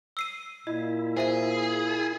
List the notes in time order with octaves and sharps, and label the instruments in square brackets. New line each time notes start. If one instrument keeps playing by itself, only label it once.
[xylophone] E6 C7 D#7
[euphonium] A#2 [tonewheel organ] E4 [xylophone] D#5
[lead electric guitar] G#4 [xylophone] C5 E5 D#7